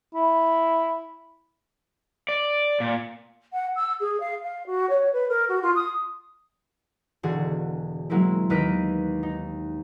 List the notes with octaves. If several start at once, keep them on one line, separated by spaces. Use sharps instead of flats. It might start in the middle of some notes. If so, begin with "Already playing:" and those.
E4
D5
A#2
F#5
E6
G#4
F5
F5
F#4
C#5
B4
A#4
F#4
F4
D#6
E1 D3 F#4 G#4
F#3 G#3 A#3 C4 E4
D#2 B4 D#5 F6 B6 D7
D#4